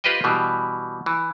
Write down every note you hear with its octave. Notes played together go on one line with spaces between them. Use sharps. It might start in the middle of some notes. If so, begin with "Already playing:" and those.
F4 G4 B4 C5 D#5 G5
B2 E3 G3
E3